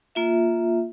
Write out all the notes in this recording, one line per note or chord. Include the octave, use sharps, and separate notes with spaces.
A#3 F4 E5